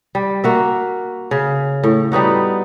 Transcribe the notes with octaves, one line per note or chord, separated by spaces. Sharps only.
G3
A#3 F#4 E5
C#3
A2
G3 B3 D#4 F#4